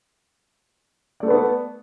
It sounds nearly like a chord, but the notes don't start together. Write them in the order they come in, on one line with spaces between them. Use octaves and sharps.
D5 A3 A4 B4 B3